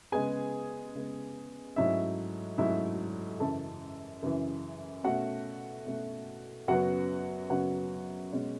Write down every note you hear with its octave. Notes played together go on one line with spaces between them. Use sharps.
C#3 G#3 B3 G#4 G#5
C#3 G#3 B3
G#2 F#3 A3 C#4 E4 E5
G#2 F#3 A3 C#4 E4 E5
F#2 C#3 E3 A4 A5
F#2 C#3 E3
B2 A3 C#4 F#4 F#5
B2 A3 C#4
F#2 C#3 F#3 B3 F#4 F#5
F#2 C#3 F#3 B3 F#4 F#5
B2 G#3 C#4